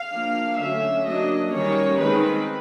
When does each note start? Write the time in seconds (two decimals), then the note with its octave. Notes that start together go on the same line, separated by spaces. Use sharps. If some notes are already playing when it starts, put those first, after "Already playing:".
Already playing: F5
0.12 F3 A#3 D4
0.59 D3 F#3 A3 C#4 E5
1.06 F#3 A#3 D4 D#5
1.53 D#3 G3 A#3 C#4 C#5
1.99 D#3 G#3 C4 B4